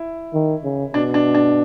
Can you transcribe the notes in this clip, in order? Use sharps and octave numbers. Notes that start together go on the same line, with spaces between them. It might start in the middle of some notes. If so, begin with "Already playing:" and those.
Already playing: E4
D#3
C#3
B2 D4
D4
D4